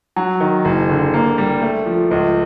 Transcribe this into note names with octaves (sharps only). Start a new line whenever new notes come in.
F#3
D#3
F#1
D3
A#3
G3
A3
F3
C#2